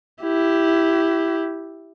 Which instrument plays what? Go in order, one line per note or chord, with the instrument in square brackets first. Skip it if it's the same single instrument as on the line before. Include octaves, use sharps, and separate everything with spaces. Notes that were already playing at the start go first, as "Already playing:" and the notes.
[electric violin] E4 G4